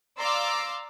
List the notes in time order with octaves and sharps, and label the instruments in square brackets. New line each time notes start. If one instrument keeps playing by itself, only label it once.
[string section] D5 F5 A#5 C6 D6 E6